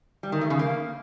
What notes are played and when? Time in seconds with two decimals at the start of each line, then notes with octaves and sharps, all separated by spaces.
0.23 G3
0.32 D#3
0.41 A3
0.50 C#3
0.59 A#3